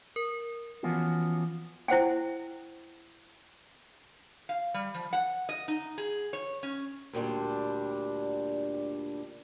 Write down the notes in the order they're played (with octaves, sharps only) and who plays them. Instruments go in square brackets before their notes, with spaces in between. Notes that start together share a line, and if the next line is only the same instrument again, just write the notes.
[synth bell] A#4
[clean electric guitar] E3 F3 B3 C#4 F4 F#4
[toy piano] E4 C5 F#5 G5
[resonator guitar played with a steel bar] F5
G3
F3
F#5
D#5
D#4
G#4
C#5
C#4
[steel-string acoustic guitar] D2 A#2 G3 D4